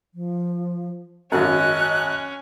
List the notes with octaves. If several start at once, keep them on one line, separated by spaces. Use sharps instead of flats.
F3
G#1 F#2 C#4 D#5 F#6